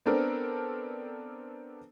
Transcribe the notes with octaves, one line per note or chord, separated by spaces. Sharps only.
B3 C4 D4 A4 A#4